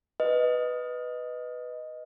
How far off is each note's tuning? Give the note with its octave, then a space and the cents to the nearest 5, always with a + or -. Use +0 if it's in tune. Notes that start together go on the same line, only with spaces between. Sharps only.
B4 +0 D#5 +0